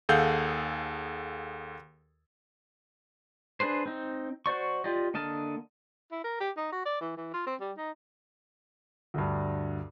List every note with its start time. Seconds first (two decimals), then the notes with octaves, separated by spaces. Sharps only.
0.09 D#2 G#4 A4 F5 F#5 G6
3.60 D4 G#4 B4 C5
3.86 C4 D#4
4.46 F#4 C5 D5 C#6
4.84 F4 G4 D5 D#5
5.14 D3 A#3 D#5 A5 F6
6.12 E4
6.24 A#4
6.41 G4
6.57 D#4
6.72 F#4
6.85 D5
7.01 E3
7.17 E3
7.34 F4
7.47 C4
7.61 G3
7.77 D#4
9.14 D2 G2